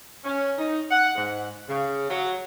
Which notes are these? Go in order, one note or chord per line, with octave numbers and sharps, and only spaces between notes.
C#4
D#4
F#5
G#2
C#3
F#3